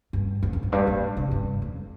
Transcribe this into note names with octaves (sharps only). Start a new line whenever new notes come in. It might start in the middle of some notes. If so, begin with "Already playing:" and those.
G2
F2
G2
F2
G2
A#2
C3
G2
F2